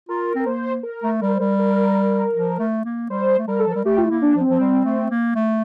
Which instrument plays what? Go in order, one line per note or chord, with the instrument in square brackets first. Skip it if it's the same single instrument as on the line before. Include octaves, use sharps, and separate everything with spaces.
[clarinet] F4 [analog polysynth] A#4
[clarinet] C4 [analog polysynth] A#4
[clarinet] A#3 [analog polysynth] C5
[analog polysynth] A#4
[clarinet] A3
[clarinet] G3 [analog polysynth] A#4
[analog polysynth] C5
[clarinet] G3 [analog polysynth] A#4
[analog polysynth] A#4
[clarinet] F3
A3
A#3
[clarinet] G3 [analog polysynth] C5
[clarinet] A3
[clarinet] G3 [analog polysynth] A#4
[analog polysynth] A4
[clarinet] F3
[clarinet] G3 [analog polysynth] A#4
[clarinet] A3 [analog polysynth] G4
[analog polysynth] F4
E4
[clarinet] A#3
[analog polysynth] D4
[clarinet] F3
[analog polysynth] C4
[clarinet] F3
G3
A3
A#3
A3